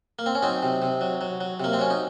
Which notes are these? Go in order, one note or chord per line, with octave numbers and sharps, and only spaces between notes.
A#3
C4
C#4
F#3 C4 D#4
C3
C3
F#3
F#3
F#3
C3 A#3
C4
F#3 C#4
D#4